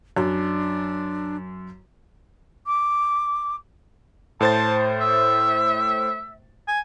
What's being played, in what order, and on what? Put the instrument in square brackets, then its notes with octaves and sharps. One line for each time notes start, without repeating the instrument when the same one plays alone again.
[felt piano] F#2 [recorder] D4
[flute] D6
[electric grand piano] A2 C5 A6 [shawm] A5
[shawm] E5
G#5